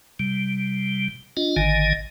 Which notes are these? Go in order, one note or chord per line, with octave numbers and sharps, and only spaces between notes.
C3 G3
D4 F4 D#5
G#1 D3 D#3 D#5 G#5